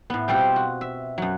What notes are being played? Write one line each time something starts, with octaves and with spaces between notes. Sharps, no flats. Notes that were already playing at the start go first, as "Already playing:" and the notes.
A2 B3
B2 G3 C4 F4 G4
F#4
E5
F#2 F#3